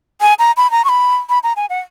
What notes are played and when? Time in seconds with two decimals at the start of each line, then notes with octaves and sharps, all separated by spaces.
0.21 G#5
0.39 A#5
0.57 B5
0.71 A#5
0.85 C#6
0.89 B5
1.29 B5
1.43 A#5
1.56 G#5
1.70 F#5